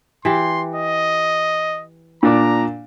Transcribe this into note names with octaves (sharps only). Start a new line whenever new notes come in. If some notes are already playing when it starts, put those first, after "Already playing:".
E3 G4 C6
D#5
A#2 D4 A#5 D6